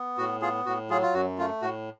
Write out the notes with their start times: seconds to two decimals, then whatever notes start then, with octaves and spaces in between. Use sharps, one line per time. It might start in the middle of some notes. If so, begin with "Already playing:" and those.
Already playing: B3
0.18 A2 F#4
0.41 B3 F4 G#4
0.66 A2 F#4
0.90 F#3 F4 G#4
1.02 F4
1.14 F#2 F#4
1.38 A3 F4
1.62 A2 F#4